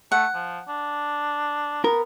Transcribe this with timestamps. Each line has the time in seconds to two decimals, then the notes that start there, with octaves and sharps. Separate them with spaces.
0.12 A3 F#5
0.34 F3
0.69 D4
1.84 B3 A#4